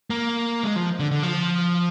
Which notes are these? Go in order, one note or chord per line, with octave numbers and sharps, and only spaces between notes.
A#3
G#3
F3
D3
D3
F3